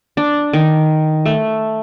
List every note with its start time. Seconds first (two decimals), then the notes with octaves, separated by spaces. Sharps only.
0.17 D4
0.53 D#3
1.25 A3